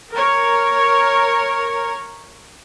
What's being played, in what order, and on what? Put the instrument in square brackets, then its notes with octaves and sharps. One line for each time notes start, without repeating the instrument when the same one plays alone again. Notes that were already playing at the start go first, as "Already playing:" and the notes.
[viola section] A#4 C#5